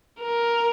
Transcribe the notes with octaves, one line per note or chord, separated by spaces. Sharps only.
A#4